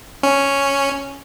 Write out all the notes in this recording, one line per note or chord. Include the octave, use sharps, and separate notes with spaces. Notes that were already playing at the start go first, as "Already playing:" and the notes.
C#4